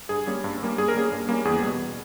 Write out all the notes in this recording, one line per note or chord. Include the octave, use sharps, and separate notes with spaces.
G2 G#4
G3 A#3 C#4
G2
G3 A#3 C#4
G2 G#4
A#4
G3 A#3 C#4 G#4
G2
G3 A#3 C#4
E2 G#4
B2 G3